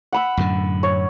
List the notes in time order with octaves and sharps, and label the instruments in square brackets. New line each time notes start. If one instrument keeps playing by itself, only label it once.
[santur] F#5 B5 E6
[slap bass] F#2 A2 D3
[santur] C#5